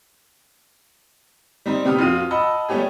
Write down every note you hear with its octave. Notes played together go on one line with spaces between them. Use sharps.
G3 C4 D#4
C3 B3 G4 D#6 F6
F2 F4 F#4 F5 D#7
D#5 F#5 A5 B5 E6
G3 A3 B3 C#4 G4 G#4